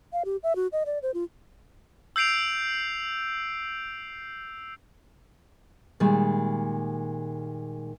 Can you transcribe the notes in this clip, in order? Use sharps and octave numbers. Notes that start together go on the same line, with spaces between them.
F5
G4
E5
F#4
D#5
D5
C5
F4
E6 G6 C7 D7 F7
A#2 D#3 G3 G#3